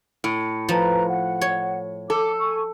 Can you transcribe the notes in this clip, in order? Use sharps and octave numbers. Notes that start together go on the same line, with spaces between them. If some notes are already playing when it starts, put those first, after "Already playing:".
A2
F3 B4 A#5
F#5
C#5
A4 D6
G#5 C#6